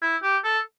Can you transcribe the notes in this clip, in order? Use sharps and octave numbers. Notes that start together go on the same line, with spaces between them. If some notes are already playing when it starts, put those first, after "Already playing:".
E4
G4
A4